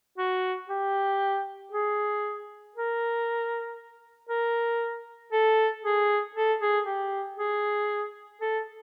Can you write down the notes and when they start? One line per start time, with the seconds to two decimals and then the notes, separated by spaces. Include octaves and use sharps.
0.18 F#4
0.69 G4
1.72 G#4
2.76 A#4
4.29 A#4
5.32 A4
5.83 G#4
6.35 A4
6.61 G#4
6.86 G4
7.38 G#4
8.41 A4